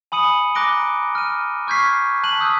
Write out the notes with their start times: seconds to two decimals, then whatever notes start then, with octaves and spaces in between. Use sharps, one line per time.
0.12 G#5 B5 D#6 C#7 D#7
0.55 A#5 D6 F#6 A#6 D7 G7
1.15 F6 D#7
1.67 C#6 F6 G6 G#6 B6 C7
2.23 A5 F#6 B6 D#7 F#7
2.41 D#6 E6 F#6 G6 B6